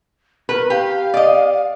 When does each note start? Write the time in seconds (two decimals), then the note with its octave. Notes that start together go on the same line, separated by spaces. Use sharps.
0.49 A#4 B4
0.70 G4 F5
1.14 D5 D#5